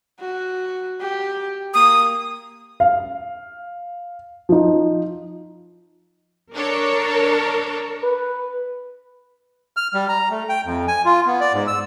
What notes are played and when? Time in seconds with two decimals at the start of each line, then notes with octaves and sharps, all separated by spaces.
0.20 F#4
1.01 G4
1.74 A#3 D#6
2.80 F5
4.49 F3 D#4
6.53 D4 A4 A#4 C#5
8.03 B4
9.77 F6
9.94 G3
10.08 A#5
10.30 A3
10.49 G5
10.65 F2
10.88 G#5
11.05 F4
11.26 B3
11.41 D5
11.53 G#2
11.67 E6